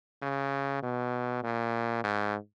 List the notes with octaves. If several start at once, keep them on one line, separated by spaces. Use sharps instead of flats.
C#3
B2
A#2
G#2